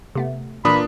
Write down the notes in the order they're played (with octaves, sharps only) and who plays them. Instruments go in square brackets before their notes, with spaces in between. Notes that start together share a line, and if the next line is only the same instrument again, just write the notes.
[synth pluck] C3 A3 B3
[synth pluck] A#2 E3 F4 [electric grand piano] A#3 D4 D#6 [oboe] B5